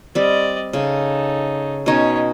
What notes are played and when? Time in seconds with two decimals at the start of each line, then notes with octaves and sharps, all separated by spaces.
0.15 G3 C4 D5 D#5
0.73 C#3 D#4 A4
1.86 B2 C#4 D#4 C#5